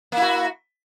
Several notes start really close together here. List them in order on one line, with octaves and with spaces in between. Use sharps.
A#3 E4 F#4